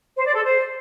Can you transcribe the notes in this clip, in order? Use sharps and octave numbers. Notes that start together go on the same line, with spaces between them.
C5
D5
A4
C5